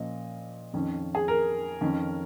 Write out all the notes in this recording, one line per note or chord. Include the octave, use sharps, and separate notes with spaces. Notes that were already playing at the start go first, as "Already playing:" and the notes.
Already playing: A#2 F3 A#3 C#4 D#5
F2 D#3 C#4
G#4
A#4
F2 D#3 C#4